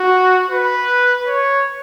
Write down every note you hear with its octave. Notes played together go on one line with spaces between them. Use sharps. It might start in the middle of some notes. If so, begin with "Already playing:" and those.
Already playing: F#4
B4
C#5